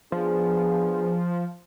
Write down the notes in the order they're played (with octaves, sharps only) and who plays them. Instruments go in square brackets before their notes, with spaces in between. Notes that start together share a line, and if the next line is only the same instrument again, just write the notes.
[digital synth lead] F3 [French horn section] B3 D4 G#4